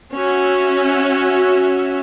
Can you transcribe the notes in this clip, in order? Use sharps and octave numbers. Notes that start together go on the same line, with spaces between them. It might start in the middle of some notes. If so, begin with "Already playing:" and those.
C#4 F#4 E5